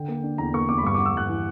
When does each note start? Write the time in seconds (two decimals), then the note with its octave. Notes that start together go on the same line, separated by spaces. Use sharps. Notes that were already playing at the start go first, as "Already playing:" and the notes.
Already playing: D3 G5
0.08 A#3
0.24 D4
0.38 E2 A#5
0.54 A#3 C#6
0.69 E2 D6
0.78 B5
0.84 G2 C#6
0.94 D6
0.98 B3
1.06 E6
1.14 G2 F#6
1.29 E3